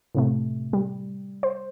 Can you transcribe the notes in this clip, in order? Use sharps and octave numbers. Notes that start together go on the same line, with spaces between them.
A2 C3 A3
G3
C5